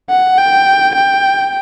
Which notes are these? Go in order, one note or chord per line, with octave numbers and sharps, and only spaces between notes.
F#5
G5
G5